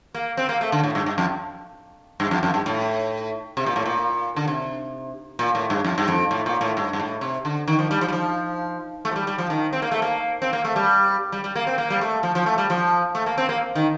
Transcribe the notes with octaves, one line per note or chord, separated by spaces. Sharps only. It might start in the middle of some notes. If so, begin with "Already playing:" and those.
A#3
C4
A#3
A3
D3
A2
G2
G2
F2
G2
F2
F2
G2
A2
C3
A#2
A2
A#2
D3
C3
A#2
A2
G2
F2
G2
F2
A2
A#2
A2
G2
G2
A2
C3
D3
D#3
F3
G3
F3
G3
F3
A3
F3
G3
G3
F3
D#3
C4
A#3
A3
A#3
C4
A#3
A3
G3
G3
G3
A#3
C4
A#3
G3
A3
F3
F3
A3
G3
F3
A3
A#3
C4
A#3
D#3